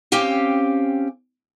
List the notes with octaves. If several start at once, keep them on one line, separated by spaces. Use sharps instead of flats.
C4 C#4 G4 F5 G5